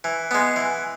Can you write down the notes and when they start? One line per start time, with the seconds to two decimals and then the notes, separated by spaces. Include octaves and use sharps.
0.04 E3
0.31 G#3 B3
0.56 E3